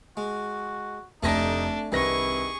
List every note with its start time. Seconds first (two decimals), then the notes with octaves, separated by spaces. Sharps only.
0.17 G#3 F#4
1.23 F1 A3 D4 D#4 A4 G#5 A#6
1.92 C2 D#3 C4 E4 G#4 B4 C#6 A#6